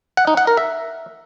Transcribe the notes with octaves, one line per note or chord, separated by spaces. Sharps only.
F#5
D#4
F#5
A#4
E5